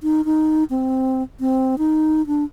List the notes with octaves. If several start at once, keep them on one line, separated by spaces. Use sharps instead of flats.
D#4
D#4
C4
C4
D#4
D4